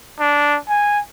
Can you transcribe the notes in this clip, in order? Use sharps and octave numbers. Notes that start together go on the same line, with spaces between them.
D4
G#5